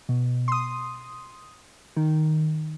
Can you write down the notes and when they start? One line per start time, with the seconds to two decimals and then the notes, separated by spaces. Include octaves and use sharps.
0.09 B2
0.48 C6 D#6
1.97 D#3